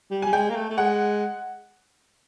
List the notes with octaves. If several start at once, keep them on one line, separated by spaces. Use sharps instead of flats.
G3
G3 G#5
G#3 G5
A#3
A3
A3
G#3 F#5